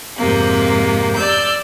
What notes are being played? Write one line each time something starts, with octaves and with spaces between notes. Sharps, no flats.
F2 G#2 C3 A#3
D5 E6 G6